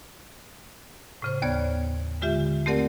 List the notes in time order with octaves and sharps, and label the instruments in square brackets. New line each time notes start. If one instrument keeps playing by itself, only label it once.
[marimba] A2 C#3 C5
D#2 B3 C#5 D5 G#6
D3 G#3 F4 G4 E5 G6
A3 C4 G4 A#4 D5 F#5